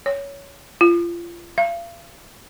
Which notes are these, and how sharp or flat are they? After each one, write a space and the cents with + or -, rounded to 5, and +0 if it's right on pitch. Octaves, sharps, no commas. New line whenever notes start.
C#5 +15
F4 -30
F5 -40